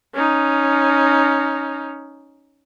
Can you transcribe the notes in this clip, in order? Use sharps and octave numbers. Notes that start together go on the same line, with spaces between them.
C#4 D#4